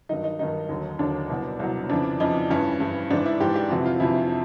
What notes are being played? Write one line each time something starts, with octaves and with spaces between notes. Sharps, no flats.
G2 D#3 F#3 D#4
D#4
G2 D#3 F#3 D#4
D#2 D3 F#3
D#2 D3 F#3 D4
C2 B2 F#3
C2 B2 F#3
F2 C#3 E3 D4
F2 C#3 E3 D#4
G2 E3 C#4
G2 E3
G#2 E3 D4
E4
G#2 E3 G4
G4
F2 C3 E3 F#4
F4
F2 C3 E3 E4